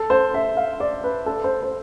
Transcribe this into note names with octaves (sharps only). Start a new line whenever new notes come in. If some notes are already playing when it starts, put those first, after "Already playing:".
Already playing: A4
C5
E5
F5
D5
B4
A4
C5
C5